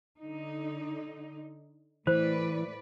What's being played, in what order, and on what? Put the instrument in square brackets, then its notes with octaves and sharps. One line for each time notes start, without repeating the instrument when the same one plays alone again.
[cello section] D3 D#4
[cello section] A2 B4 D5 [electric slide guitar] E3 [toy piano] C5